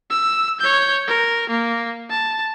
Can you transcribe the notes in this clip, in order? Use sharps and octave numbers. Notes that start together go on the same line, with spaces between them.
E6
C#5 G6
A#4
A#3
A5